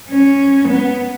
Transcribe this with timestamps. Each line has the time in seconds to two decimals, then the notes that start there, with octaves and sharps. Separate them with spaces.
0.09 C#4
0.69 B3